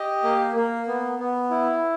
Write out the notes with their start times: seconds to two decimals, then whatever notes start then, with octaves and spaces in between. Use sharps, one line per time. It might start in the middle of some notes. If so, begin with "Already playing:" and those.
Already playing: G4 D#5
0.24 A#3
0.56 A#3
0.88 B3
1.19 B3
1.50 E4